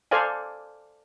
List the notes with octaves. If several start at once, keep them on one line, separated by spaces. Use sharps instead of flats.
A4 C5 D5 F5 G#5